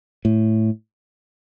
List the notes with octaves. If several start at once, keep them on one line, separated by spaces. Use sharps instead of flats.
A2